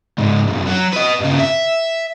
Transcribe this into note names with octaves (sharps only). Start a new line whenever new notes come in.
C#2 G#2
C2 F#2
F#3
B4 D#5
G2 C#3
E5